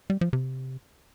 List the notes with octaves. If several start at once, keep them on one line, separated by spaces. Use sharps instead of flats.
G3
F3
C3